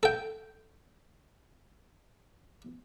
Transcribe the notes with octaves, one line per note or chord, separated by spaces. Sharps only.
A4 G5